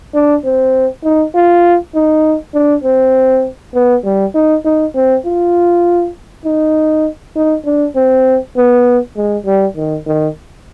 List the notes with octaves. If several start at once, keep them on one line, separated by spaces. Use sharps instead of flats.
D4
C4
D#4
F4
D#4
D4
C4
B3
G3
D#4
D#4
C4
F4
D#4
D#4
D4
C4
B3
G#3
G3
D#3
D#3